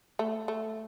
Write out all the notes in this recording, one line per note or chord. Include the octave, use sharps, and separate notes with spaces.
A3
A3